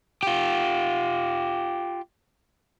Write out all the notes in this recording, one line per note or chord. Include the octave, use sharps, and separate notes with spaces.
F4 G4